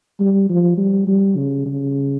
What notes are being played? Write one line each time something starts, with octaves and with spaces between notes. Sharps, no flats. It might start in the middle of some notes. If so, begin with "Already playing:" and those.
G3
F3
G3
G3
C#3
C#3